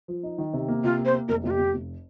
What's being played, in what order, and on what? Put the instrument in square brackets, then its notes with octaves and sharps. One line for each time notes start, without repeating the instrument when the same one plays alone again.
[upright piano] F3
D#4
D#3
C3
A#3
[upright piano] C3 [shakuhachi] F4
[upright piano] A#3
[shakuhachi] C5
[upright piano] A#3
[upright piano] F1 [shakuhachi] A#4
[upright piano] F1 [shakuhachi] F4
[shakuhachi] G4
[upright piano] F1
F1